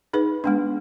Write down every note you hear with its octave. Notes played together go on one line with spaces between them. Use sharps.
D#4 G#4 B4
G#3 B3 D4